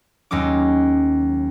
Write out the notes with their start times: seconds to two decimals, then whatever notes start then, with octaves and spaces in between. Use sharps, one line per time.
0.31 D#2 F#3 G#3 C#4 D6